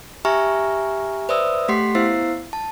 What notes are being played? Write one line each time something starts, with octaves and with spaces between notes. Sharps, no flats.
G4 E5 G#5 A#5 C#6 F6
B4 C5 D5 E5 D#6 E6
A3 G4 F#5 C6 B6 C7
B3 E4 C5 F5 E6 C7
A5